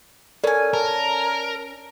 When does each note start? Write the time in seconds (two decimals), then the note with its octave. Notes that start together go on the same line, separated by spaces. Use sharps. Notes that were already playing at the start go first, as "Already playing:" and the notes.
0.44 C#4 A4 A#4 D5 G#5
0.74 A#4 A5